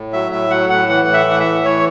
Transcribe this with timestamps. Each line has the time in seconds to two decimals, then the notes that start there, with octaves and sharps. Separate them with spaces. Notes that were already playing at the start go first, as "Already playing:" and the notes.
Already playing: A2
0.13 F#3 E5
0.31 A2 E5
0.50 F#3 F#5
0.70 A2 F#5
0.89 E3 F#5
1.07 A2
1.13 E5
1.26 E3 F#5
1.40 E5
1.46 A2
1.64 E3 C#5